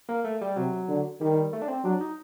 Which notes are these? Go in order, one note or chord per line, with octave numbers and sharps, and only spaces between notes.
A#3
A3
G3
C3 F#3
D3
D#3 G3
A3
D4
C4
F#3 D4
D#4